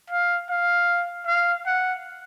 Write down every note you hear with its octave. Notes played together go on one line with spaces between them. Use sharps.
F5
F5
F5
F#5